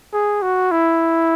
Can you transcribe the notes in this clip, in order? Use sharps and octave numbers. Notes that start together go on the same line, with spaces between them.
G#4
F#4
E4